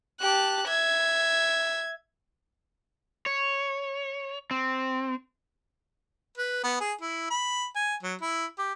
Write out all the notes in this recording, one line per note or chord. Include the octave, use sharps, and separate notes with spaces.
G4 A5 F#6
E5 G#6
C#5
C4
B4
B3
G#4
E4
B5
G#5
F#3
E4
G4